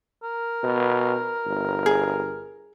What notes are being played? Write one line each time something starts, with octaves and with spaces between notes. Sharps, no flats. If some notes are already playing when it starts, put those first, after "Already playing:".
A#4
B2
G1
G#4